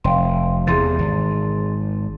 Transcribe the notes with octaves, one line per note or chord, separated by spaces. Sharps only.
F1 F5 G5 C6
E2 C3 E3 G#4 C6 A6
G#1